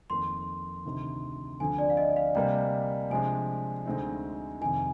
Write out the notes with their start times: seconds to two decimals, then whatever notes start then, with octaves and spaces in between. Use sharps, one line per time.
0.10 F2 D#3 A#3 C6
0.85 D2 C3 D#3
1.60 D2 D3 F3 C4 G#5
1.78 D5
1.90 F5
1.97 D#5
2.16 F5
2.35 C3 G3 A#3 G5
3.10 C3 F3 G#3 D4 G#5
3.86 D2 D3 G#3 C4 D#4
4.61 F2 C3 D#3 G#5